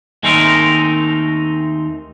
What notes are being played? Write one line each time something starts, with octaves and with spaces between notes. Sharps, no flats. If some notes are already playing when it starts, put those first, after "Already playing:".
D#2 G#3 A3 C4 D#4 A#4